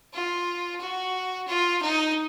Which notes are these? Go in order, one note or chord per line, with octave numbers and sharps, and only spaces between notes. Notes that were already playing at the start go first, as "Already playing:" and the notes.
F4
F#4
F4
D#4